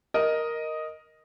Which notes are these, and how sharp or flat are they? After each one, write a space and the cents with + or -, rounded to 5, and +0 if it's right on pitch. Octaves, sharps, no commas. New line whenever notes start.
A#4 +0 D#5 +0